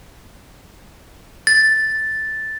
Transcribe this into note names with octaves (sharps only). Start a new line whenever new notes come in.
A6